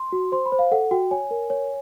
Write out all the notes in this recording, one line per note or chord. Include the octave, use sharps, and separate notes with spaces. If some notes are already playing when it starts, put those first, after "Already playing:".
Already playing: C6
F#4
C5 C6
B5
C5
F5
A4 F#5
F#4 G5
C#5 G#5
A#4
C#5